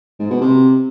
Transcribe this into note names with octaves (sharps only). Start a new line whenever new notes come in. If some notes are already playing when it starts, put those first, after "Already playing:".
G#2
B2
C3